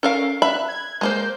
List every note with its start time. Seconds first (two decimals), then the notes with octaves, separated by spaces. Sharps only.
0.03 C#4 A4 A#4 F5
0.42 E5 B5 F#6
0.68 G#6
1.01 G#3 A#3 C5 G6